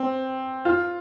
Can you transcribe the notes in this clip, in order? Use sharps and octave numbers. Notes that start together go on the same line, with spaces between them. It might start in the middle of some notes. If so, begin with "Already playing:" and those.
Already playing: C4
F4